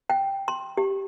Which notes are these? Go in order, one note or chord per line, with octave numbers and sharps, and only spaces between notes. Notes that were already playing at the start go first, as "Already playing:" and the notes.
G5
C6
G4